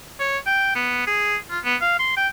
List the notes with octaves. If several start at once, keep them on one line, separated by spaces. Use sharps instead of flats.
C#5
G5
B3
G#4
F4
B3
F5
C6
G5